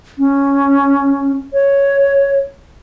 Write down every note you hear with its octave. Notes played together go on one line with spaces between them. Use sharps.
C#4
C#5